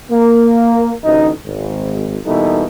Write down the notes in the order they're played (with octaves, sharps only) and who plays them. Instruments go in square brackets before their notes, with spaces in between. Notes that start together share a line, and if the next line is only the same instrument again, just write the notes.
[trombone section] A#3
A1 D2 D#4
G#1
B2 E3 G3 A#3 D#4 A4